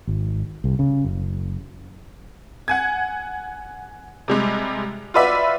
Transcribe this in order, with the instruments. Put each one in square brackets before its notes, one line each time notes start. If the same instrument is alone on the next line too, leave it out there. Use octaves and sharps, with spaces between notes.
[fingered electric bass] G#1
C2
C#3
F#1
[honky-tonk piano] F#5 G#5 G#6
C3 G3 G#3
F4 F#4 B4 D5 E5